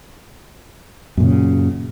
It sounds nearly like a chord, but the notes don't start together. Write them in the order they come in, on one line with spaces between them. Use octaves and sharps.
F#2 A#2 C#3